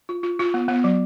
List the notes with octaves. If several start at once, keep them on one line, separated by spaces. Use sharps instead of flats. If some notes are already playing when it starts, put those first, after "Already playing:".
F4
F4
F4
B3
B3
F#3